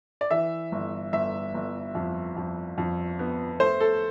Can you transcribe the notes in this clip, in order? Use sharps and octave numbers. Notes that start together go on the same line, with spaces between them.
D5
E3 E5
G1
G1 E5
G1
F2
F2
F2
B3
A3 C5
A4